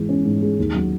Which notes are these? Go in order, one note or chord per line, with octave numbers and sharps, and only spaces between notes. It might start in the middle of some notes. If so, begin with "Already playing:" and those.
Already playing: G#2 E3 G#3
C#4
G#2
G#3
D#2
F#3